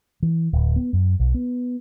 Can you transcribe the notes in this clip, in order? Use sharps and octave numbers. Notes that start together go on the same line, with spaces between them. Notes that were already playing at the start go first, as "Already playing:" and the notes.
E3
D1
B3
F#2
B1
B3